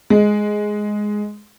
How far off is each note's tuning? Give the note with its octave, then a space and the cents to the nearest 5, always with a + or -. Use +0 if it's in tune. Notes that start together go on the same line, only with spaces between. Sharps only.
G#3 +5